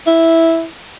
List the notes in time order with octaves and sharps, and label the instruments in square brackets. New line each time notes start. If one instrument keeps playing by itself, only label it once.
[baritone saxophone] E4